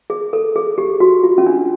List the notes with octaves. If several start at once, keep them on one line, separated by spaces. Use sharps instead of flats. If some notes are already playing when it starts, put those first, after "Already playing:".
G#4
A4
G#4
G4
F#4
F4
C#4
D4